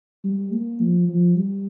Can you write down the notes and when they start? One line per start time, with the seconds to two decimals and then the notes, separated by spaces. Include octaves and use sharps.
0.24 G3
0.52 A#3
0.80 F3
1.09 F3
1.37 G3